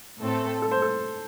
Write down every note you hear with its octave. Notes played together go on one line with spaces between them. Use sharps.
A2 A3 C4 A4
A4
C5
A4